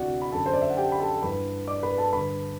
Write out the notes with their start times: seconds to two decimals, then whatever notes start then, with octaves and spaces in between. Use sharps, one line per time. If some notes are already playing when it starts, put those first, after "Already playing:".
Already playing: D2 C3 E3 F#4 D5 F#5
0.22 B5
0.32 F#2 D3 A4 A5
0.46 C5
0.53 D5
0.62 E5
0.70 F#5
0.77 G4 G5
0.92 B5
1.00 A4 A5
1.22 G2 E3 B4 B5
1.67 D5 D6
1.83 B4 B5
1.97 A4 A5
2.13 G2 D3 B4 B5